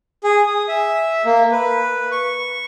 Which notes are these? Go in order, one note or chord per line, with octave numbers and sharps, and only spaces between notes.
G#4
D#6
E5
A#3
B4
C#6